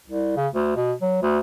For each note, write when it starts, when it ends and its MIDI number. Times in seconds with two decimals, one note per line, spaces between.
0.07 0.34 36
0.37 0.48 49
0.55 0.75 38
0.76 0.93 47
1.02 1.21 54
1.23 1.39 38